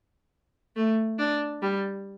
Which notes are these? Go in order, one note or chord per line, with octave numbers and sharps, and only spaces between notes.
A3
D4
G3